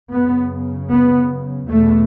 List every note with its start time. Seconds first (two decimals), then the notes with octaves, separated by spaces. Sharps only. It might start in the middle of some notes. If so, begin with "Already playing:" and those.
0.11 F#2 C#3 B3
0.90 B3
1.69 E2 B2 A3